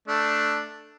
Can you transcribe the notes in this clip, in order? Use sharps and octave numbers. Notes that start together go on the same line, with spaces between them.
A3 D4